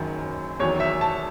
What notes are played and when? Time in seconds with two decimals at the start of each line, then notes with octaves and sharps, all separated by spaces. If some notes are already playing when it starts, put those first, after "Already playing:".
Already playing: F#1 F#2 D#3 F#3
0.60 E2 D#3 F#3 C#5
0.80 E5
1.01 A5